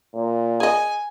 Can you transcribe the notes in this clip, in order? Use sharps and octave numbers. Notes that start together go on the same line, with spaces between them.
A#2
G#4 D#5 G#5